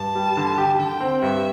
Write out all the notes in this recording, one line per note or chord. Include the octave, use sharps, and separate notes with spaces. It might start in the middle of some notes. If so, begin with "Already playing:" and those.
Already playing: G2 A5
G3
D3
G4
D3 G5
C4
G2 E5